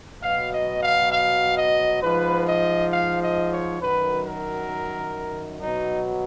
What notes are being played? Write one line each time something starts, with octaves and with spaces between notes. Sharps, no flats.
B2 F#3 F5
D#5
F5
F5
D#5
G#2 F3 B4
D#5
F5
D#5
C#5
F#2 D#3 F#3 B4
A#4
B2 F#3 D#4